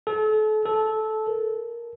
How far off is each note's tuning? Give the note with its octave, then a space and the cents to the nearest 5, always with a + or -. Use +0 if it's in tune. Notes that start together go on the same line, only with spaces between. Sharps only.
A4 -35
A4 -15
A#4 +10